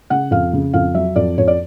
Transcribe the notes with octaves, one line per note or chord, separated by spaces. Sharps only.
C#3 F#5
F2 F5
C#3
F2 F5
F#3 E5
F2 D5
F2 C#5
D5